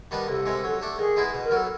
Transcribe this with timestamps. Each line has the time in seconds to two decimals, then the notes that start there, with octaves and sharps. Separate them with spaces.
0.11 D#3 G3 B3 D4
0.28 C2 A4
0.46 C3 D#3 G#3
0.64 F#3
0.81 A3 D4
0.98 D#3 G#4
1.16 G#3 B3 E4
1.34 B2
1.45 A#4
1.51 F#3 B3
1.57 A4